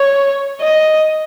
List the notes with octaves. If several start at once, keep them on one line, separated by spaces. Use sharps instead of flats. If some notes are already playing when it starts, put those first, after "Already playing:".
Already playing: C#5
D#5